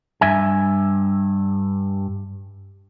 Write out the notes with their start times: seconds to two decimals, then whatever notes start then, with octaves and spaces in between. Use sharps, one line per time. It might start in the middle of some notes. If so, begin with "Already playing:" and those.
0.21 G2 E5 G#5